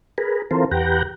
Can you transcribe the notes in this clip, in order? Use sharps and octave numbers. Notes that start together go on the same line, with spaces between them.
G#4 A#4 B4
E3 C4 F4 A4 A#4 C5
E2 G4 B4 F#5 G5 A#5